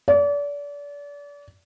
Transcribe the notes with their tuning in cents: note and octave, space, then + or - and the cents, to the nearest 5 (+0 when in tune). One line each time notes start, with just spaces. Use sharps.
D5 -35